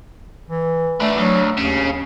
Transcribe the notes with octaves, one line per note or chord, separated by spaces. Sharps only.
E3
A3 B3 D4
D2 F#3
D#2 C#3